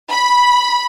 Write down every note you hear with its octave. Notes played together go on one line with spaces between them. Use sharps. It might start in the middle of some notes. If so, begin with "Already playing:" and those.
B5